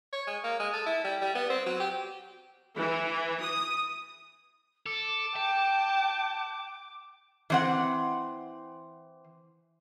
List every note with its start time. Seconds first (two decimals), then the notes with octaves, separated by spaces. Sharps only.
0.13 C#5
0.27 G#3
0.44 A#3
0.60 G#3
0.74 A4
0.86 E4
1.04 G3
1.21 G3
1.35 B3
1.50 C4
1.66 F#3
1.80 G4
2.75 E3
3.42 D#6
4.86 A4 D6
5.36 G5 A5
7.50 E3 C4 F#5